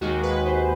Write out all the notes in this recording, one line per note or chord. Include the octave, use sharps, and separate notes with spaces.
D#2 D#3 G#3 F#4
B4
C5